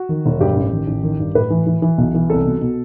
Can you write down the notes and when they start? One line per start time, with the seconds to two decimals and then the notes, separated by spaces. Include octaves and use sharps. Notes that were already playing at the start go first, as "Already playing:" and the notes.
Already playing: F#4
0.09 D#3
0.26 E1
0.40 G2 G4
0.56 A1
0.72 D#3
0.87 A1
1.03 D#3
1.20 G2
1.35 A2 B4
1.50 E3
1.67 E3
1.82 E3
1.98 B1
2.14 E3
2.29 C2 A4
2.46 B2
2.61 B2